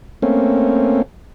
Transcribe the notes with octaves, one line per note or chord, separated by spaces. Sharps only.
A3 A#3 C4 C#4